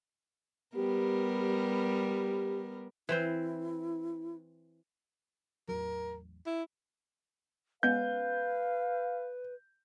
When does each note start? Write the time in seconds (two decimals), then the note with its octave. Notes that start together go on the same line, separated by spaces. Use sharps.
0.76 G3 B3 G4 A#4
1.40 G4
3.09 E3 C4 E4 C5
5.68 A1 E2 F#3 A#4
6.46 E4
7.83 G#3 B3 C#4 B4 F5 G6